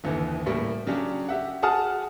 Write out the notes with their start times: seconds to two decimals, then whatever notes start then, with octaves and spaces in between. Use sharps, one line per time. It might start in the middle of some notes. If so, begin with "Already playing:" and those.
0.04 F#1 D#2 D3 E3
0.46 A2 G3 A#3
0.87 C#3 F#3 C#4 D4 G4
1.29 G4 E5 F#5
1.63 F#4 G#4 F#5 A5 D#6 F6